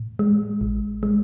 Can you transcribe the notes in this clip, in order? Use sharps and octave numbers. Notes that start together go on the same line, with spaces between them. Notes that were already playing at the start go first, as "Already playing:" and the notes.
Already playing: A2
G#3
A1
G#3